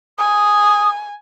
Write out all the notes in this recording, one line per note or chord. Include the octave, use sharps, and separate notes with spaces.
G#5 D#6